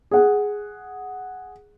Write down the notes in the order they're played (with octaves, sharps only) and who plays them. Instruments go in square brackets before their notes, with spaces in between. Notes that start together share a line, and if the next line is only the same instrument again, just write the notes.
[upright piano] G#4 F#5